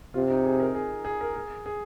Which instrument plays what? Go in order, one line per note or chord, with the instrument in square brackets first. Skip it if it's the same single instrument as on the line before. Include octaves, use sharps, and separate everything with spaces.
[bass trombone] C3 [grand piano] F4
[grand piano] D#4
G#4
A#4
G#4
G#4
A#4
G#4
G#4